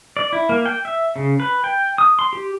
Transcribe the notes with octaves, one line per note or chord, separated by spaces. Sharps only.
D5
E4
A#3
G5
E5
C#3
B4
G5
D#6
C6
G4